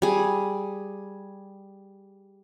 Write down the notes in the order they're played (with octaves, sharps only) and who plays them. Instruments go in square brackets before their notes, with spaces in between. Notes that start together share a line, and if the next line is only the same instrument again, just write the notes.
[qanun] G3 G#4